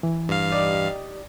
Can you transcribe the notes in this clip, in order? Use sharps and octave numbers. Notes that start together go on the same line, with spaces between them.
E3
G2 F5
D#4 G4 D5